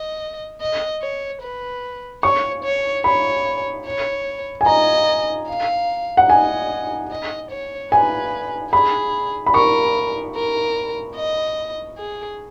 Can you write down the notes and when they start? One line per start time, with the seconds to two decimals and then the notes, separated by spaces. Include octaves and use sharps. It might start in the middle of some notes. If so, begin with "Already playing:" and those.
Already playing: D#5
0.61 D#5
1.01 C#5
1.42 B4
2.23 C#5 C#6
2.64 C#5
3.04 C#5 B5
3.86 C#5
4.61 G#5
4.66 D#5 A#5
5.49 F5
6.17 F#5
6.29 D#5 G#5
7.11 D#5
7.51 C#5
7.91 B4 G#5
8.73 G#4 B5
9.46 B5
9.54 A#4 C#6
10.35 A#4
11.16 D#5
11.98 G#4